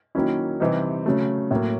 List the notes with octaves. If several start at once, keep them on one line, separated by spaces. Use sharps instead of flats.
D#3 F#3 A#3 C#4 E4
C3 E3 G3 C4 D#4
C#3 F#3 A3
A2 F#3 A#3